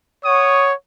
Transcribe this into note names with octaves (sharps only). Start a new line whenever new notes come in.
C#5 F#5 C#6 D#6